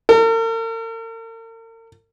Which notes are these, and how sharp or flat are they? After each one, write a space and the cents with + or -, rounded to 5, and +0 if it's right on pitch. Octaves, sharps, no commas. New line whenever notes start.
A#4 -45